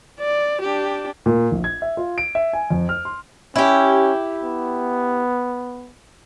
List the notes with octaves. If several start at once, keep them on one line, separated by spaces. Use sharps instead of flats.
D5
D4 G4
A#2
A#1
G#6
E5
F4
D7
E5
G#5
F2
F6
C6
C#4 E4 G4
B3